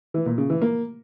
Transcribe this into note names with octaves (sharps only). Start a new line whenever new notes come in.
E3
A#2
C#3
E3
A#3